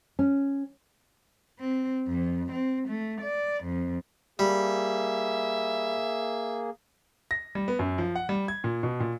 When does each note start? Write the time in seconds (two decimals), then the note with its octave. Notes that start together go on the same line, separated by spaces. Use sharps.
0.19 C#4
1.59 C4
2.08 F2
2.52 C4
2.89 A3
3.22 D5
3.65 F2
4.39 G3 A#3 G#4 E5
7.31 A#6
7.55 G3
7.68 B3
7.79 F#2
7.98 F3
8.16 F#5
8.29 G3
8.48 G#6
8.64 A#2
8.83 B2
9.00 A#2